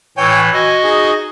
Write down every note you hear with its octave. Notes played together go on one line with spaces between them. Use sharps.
A2 E3 C#5 G5 G#5
F#4 D#5 G#5
D#4 G#4